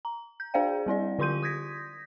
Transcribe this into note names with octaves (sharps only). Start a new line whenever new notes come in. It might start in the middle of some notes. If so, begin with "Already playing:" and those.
A#5
G6
D4 G#4 C5 D5 F5 G5
G3 C4 E4 D5
D3 F4 G4 C6 G6 D#7
D#6 G6 G#6 A#6 B6